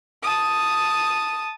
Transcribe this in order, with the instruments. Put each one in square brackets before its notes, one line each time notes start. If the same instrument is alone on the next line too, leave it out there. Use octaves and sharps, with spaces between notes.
[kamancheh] A5 D#6